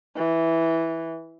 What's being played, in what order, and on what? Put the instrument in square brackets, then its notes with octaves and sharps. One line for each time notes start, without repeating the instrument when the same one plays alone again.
[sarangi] E3